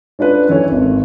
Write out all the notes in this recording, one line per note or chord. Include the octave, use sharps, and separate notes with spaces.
C#4 D4 F4 B4
F#2 E3 E4 A4 C#5
G#1